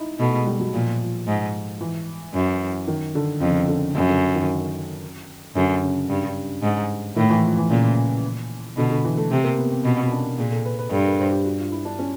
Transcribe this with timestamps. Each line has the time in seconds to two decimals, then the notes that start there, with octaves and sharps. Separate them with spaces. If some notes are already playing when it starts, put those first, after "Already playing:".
Already playing: D#4 E4
0.20 B2 A3
0.33 G#3
0.46 G3
0.60 F#3
0.73 A#2 F3
1.01 F3
1.27 G#2
1.81 E3
2.34 F#2
2.88 D#3
3.15 D3
3.41 F2 C#3
3.68 D3
3.95 F#2 C#3
4.08 D3
4.35 D#3
5.56 F#2 D3
5.83 C#3
6.09 G2
6.63 G#2
7.16 A2 D#3
7.30 E3
7.43 F3
7.57 E3
7.70 A#2 C#3
8.77 B2 D3
8.90 D3
9.05 E3
9.17 A3
9.31 C3 A3
9.44 A#3
9.58 B3
9.71 C4
9.84 B2 C#4
10.07 C#4
10.11 D4
10.38 A#2 G#4
10.52 A4
10.65 B4
10.79 B4
10.91 G2 A4
11.05 A#4
11.19 C5
11.32 G4
11.45 F#4
11.59 F4
11.72 E4
11.85 D4
11.99 C#4